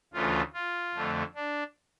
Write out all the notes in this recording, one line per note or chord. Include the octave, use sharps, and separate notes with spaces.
D2 C#3 E3 A3 F4
F4
F2 D3 A3
D4